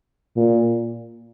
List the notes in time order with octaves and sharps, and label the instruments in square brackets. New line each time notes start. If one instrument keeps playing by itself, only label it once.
[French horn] A#2